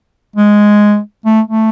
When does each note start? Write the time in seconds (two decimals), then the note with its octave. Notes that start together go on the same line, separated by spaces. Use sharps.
0.36 G#3
1.25 A3
1.48 A3